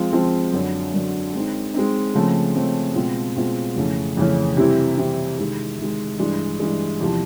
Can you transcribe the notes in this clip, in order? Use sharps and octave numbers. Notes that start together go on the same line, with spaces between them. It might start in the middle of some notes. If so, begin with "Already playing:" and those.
Already playing: F3 G#3 C4 F4
F3 G#3 C4 F4
F#2 D3 F#3
F#2 D3 F#3
G#3 C4 D#4
G#3 C4 D#4
C#3 F3 A3 C4
C#3 F3 A3 C4
B2 G#3 C4 F4
B2 G#3 C4 F4
F2 C#3 E3 A3 C#4
F2 C#3 E3 A3 C#4
C3 E3 G3 C4 E4
C3 E3 G3 C4 E4
C3 D#3 G#3
C3 D#3 G#3
G2 E3 G#3
G2 E3 G#3
E2 C3 F3